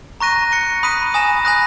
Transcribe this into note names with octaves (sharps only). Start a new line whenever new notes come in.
A#5 C#6 F#6 A#6 D#7
C#6 F#6 C#7
B5 D#6 F#6 B6 D#7
G#5 D#6 A#6 E7
G#5 B5 D#6 F#6 A#6